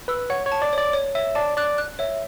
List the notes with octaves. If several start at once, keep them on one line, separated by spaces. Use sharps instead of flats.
B4 E6
C#5 F#5
C#5
A5
D5
C#5 D5
C#5
C#5 E5
D5 A5
D5 F#6
F#6
C#5 E5